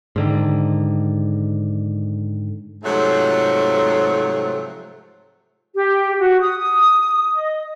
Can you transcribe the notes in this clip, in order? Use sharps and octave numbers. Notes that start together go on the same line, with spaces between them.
G#2 D3 D#3
G#2 C3 F3 F#3 A3
G4
F#4
D#6
D#6
D#5